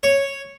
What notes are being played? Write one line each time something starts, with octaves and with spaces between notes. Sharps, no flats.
C#5